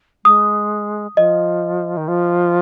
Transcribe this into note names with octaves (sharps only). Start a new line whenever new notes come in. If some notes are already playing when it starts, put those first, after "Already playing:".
G#3 D#6
F3 D#5
D#3
F3